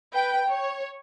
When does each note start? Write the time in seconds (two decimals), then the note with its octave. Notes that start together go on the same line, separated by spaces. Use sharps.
0.13 B4 G5
0.49 C#5